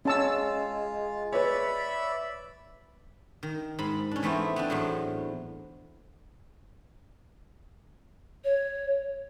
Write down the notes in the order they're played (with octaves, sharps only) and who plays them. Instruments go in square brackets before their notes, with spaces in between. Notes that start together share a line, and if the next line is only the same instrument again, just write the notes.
[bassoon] G#3 [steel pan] C#4 A5 E6 [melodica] F4
[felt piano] B4 C#5 [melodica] D5 E5 B5
[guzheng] D#3
G#2 B5
C#4 D4
E3 A3 B3 C4 E4
B3 C4 D4
E2 A2 F#3
[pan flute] C#5